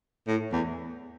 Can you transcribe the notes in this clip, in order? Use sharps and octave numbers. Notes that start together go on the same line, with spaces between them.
A2
E2